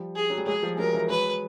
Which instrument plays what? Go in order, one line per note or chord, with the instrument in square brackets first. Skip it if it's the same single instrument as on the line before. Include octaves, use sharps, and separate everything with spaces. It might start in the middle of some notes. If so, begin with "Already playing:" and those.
Already playing: [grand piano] F3 G3
[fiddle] G#4
[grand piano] F#3
G3
[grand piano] F#3 G#3 [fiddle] G#4
[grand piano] F3 G3
[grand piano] F#3 G#3 [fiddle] A#4
[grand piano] E3 F#3
[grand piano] F#3 G#3 [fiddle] B4